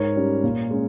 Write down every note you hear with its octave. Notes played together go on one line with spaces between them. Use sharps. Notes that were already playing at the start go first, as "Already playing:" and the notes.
Already playing: G#2 A#4 C#5
G3 C#4
A#2
G#3 C#4